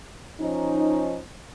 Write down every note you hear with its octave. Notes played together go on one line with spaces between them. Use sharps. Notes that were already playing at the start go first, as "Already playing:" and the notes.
F3 C#4 D#4